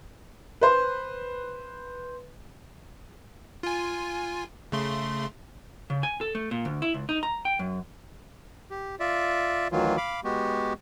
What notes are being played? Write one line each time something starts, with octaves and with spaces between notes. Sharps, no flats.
B4 C5
F4 G#5
C#3 A3 C6
C#3
G#5
A4
A3
A#2
D2
E4
C#2
D#4
A#5
G5
F#2
G4
F4 D5 E5
D2 D#3 E3 F#3 F4
F5 B5 D6
G#3 B3 F#4 G4